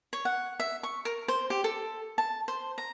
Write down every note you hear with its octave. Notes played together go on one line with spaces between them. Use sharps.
C#5
F#5
E5
C#6
A#4
C5
G4
A4
A5
C5
A#5